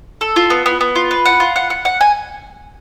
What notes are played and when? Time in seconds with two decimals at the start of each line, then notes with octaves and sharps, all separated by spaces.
0.21 A4
0.36 F4
0.50 B3
0.66 B3
0.81 B3
0.96 F4
1.11 B4
1.25 F#5
1.40 F4
1.56 F#5
1.70 F#5
1.85 F#5
2.01 G#5